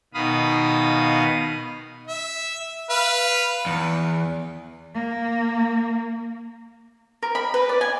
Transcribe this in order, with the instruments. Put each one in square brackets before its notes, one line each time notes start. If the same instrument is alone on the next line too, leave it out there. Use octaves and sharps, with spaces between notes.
[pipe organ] B2 D#3 F5 B5 D#6
[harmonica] E5
B4 F5
[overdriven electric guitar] E2
[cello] A#3
[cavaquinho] A#4
B5
B4
D5
G#5